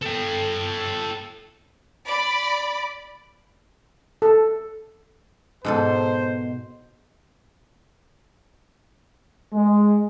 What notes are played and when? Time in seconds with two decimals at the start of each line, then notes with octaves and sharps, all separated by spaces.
0.02 A4 G5
2.06 D5 B5
4.22 A4
5.65 G#2 B2 A4 C5
9.53 G#3